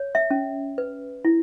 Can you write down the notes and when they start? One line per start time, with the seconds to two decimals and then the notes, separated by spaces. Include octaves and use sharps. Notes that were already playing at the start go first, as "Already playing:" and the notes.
Already playing: C#5
0.15 E5
0.31 C#4
0.78 B4
1.25 E4